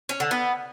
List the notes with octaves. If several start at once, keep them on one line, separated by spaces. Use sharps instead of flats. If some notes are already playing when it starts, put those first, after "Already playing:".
C#4
D3
B3